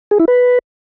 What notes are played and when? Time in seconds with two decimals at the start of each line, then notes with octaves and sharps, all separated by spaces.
0.11 G#4
0.19 E4
0.28 B4